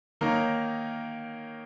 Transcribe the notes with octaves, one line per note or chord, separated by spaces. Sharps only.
D#3 A#3 D#4 A#4 C#5